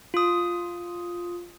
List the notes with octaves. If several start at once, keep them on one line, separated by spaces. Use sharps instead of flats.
F4 D#6